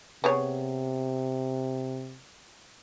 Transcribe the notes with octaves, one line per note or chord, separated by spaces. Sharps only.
C3 B3 G#4 C#5